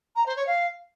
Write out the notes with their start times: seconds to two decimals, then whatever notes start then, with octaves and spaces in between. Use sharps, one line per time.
0.16 A#5
0.26 C5
0.36 C#5
0.47 F5